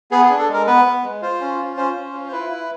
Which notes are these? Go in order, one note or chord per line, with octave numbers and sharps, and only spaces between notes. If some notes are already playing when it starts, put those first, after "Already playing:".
B3 G#4
D4 G#4
A4
G#3 A#4
B3 B4
B3
G#3
F4 C5
C#4
F4
C#4 C5
C#4
F4
C5
E4 B4
E4